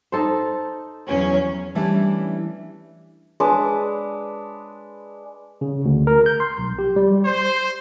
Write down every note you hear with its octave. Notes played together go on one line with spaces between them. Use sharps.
D#4 A4 C5
E2 F#3 C#4
E3 G3 A3 C#4 D4 E4
G#3 D4 B4
C#3
D2
A#4
G6
C6
B1
G4
G3
C5